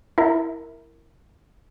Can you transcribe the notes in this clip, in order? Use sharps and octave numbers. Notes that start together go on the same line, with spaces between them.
E4 A#4